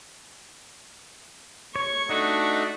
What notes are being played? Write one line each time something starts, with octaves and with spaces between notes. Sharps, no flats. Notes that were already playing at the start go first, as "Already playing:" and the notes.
C#5 C#6
A3 D4 D#4 F#4